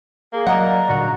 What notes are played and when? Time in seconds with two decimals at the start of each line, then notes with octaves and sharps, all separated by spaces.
0.33 A#3 G#4
0.47 F#3 D5 D#5 F#5 A#5
0.89 A#2 D3 F#3 F#4